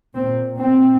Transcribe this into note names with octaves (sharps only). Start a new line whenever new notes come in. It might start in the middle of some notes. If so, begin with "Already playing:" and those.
A#2 C4
C4